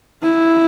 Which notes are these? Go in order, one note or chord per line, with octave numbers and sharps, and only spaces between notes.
E4